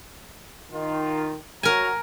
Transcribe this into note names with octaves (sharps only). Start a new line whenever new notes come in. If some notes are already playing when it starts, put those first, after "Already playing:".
D#3 F4
F#4 A#4 C#5 G#5 A#5